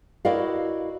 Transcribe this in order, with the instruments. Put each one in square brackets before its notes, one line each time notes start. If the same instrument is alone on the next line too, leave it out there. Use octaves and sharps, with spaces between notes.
[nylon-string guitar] E4 F#4 A#4 D5 D#5 F5